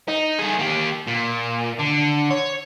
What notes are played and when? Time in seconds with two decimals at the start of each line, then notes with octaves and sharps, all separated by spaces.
0.08 D#4
0.39 A3 G#4
0.59 A#3 G4
1.07 A#2
1.79 D3
2.31 C#5